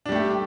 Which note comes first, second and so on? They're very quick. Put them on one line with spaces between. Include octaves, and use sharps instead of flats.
D4 G3 A3 G4